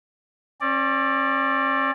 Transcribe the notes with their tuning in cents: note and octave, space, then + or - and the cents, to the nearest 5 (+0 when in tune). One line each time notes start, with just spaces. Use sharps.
C#4 -45 D5 +0